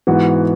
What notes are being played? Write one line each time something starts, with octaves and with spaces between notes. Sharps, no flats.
G#2 E3 B3 F#4